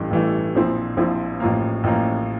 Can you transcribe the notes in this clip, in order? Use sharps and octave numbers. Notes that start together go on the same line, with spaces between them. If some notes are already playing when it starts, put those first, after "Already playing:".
Already playing: A1 G2 E3 A3 E4
A1 G2 E3 A3 E4
A#1 A#2 F3 C4 E4
A#1 A#2 F3 C4 E4
A1 A2 F3 A#3
A1 A2 F3 A#3